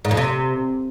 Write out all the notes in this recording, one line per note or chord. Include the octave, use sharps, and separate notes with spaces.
G#2
F2
C3